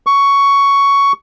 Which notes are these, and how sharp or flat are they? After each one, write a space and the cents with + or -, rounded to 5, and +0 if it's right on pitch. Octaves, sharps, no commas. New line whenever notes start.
C#6 +10